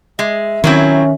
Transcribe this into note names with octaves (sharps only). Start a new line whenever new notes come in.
G#3 E5
D#3 F#3 C4 C#4 E4